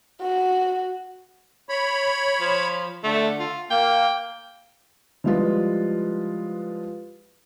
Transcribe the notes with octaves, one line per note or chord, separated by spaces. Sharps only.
F#4
C#5 B5
F3
D3 A3
F4
A#3 G5
F3 G3 G#3 E4 F4 B4